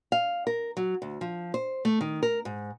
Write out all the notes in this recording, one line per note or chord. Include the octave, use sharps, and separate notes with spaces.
F5
A#4
F#3
D2
F3
C5
A3
D#3
A#4
G#2